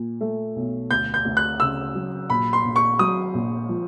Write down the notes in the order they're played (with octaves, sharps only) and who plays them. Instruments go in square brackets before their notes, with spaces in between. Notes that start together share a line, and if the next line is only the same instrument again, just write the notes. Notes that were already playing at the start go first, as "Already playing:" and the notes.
Already playing: [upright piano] A#2
A3
B1
[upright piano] D2 [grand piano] G6
[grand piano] G6
[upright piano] D2
[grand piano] F#6
[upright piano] C#3 [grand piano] E6
[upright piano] F#3
[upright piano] A#1 [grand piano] B5
[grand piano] C6
[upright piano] A#1
[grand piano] C#6
[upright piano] F#3 [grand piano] D#6
[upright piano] A#1
F3